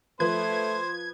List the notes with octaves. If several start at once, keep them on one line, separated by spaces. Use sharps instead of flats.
F3 A3 B4 C5 G#6